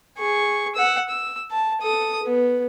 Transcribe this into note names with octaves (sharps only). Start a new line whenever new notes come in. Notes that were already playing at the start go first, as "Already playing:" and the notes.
G#4 C#6
F#5 E6
E6
A5
A4 D#6
B3